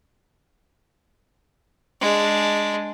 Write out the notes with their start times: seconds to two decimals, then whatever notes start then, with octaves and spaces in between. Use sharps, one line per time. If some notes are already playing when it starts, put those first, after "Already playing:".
2.01 G#3 D4